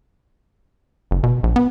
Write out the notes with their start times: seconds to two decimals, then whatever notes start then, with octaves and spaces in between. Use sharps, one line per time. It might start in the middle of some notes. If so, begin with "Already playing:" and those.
1.11 F#1
1.23 B2
1.43 A#1
1.56 B3